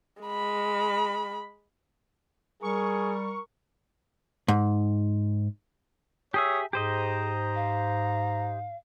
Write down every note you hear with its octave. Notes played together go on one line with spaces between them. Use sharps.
G#3 B5
G3 G#4 A#4 C#6
G#2
G4 G#4 C#5 E5 D#6
G#2 G4 G#4 C5 D#5 A#5
F5